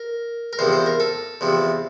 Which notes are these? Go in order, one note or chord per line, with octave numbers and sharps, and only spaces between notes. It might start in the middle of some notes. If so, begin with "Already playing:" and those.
Already playing: A#4
A#4
E2 C3 F3 C5
C5
A#4
A4
E2 C3 F3